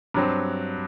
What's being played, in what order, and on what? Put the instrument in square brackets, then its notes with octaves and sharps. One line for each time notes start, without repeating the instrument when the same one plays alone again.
[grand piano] G2 F#3 C4